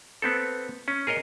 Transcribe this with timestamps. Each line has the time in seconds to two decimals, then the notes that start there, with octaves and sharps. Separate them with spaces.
0.22 B3 C4 A4
0.88 C#4
1.07 G#4 A#4 C#5 D#5